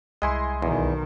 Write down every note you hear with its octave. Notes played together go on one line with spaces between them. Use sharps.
C2 G#3 E4 D#5 G#5 C6
B1 E2 D#3